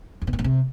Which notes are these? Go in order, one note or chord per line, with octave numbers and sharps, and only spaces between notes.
F2
B2
A#2
A2
C3